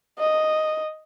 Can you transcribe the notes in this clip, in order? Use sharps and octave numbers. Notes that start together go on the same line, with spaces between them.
D#5